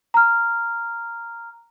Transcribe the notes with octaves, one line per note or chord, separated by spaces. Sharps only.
A#5 F6